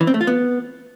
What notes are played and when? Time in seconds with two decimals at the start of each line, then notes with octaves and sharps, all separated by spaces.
0.01 E3
0.07 C4
0.14 A3
0.21 F4
0.27 B3